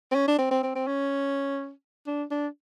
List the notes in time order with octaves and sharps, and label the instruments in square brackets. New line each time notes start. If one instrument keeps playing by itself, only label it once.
[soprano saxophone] C4
C#4
D4
C4
C4
C4
C4
C#4
D4
D4